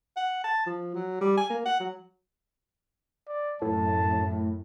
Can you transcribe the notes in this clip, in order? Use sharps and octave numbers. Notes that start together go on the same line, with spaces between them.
F#5
A5
F3
F#3
G3
G#5
A#3
F#5
F#3
D5
F#2 A2 A5